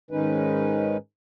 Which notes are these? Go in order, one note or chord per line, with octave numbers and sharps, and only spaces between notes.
G#2 D#3 G#3 C#4 D#4 B4